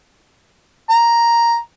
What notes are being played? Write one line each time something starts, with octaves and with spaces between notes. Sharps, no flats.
A#5